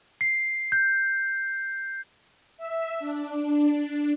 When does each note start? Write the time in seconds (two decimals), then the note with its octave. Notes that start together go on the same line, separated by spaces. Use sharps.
0.21 C7
0.72 G6
2.57 E5
3.00 D4